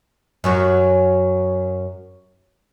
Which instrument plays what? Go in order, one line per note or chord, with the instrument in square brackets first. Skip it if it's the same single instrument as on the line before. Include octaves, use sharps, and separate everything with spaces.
[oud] F#2 F#3 F#4